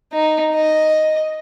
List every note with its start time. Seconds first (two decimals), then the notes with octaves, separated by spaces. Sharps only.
0.13 D#4
0.55 D#5